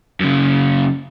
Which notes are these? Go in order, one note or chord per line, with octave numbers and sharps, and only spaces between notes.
F#2 C#3